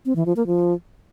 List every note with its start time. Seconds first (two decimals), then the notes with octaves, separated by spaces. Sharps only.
0.05 C4
0.16 E3
0.26 F3
0.36 A#3
0.47 F3